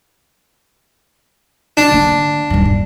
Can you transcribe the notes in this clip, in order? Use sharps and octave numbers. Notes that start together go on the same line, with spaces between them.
D4
D3 A#3
D#1 G2